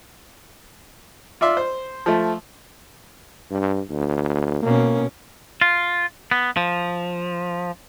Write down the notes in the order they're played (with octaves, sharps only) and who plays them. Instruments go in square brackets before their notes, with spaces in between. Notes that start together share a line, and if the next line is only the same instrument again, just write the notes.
[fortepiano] F4 D5 E5 C6
C5
F3 A3
[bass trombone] G2
D2
[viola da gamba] B2 C#4 [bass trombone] A#3
[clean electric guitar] F4
B3
F3